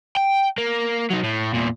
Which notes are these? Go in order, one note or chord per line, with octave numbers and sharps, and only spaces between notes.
G5
A#3
F#3 D#4
A2
E2 A#2